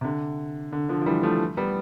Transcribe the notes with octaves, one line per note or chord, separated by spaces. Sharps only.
C3
D3
D3
D3 F3
F3
E3 G3
F3 A3
G3 B3